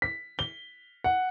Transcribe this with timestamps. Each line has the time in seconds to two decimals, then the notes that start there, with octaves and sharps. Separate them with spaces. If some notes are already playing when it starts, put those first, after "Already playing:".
0.02 B6
0.39 G7
1.04 F#5